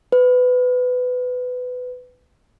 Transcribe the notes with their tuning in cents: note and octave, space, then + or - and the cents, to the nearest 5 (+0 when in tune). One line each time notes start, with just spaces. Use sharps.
B4 +20